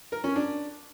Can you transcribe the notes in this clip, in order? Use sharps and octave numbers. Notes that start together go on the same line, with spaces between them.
A#4
C#4
D4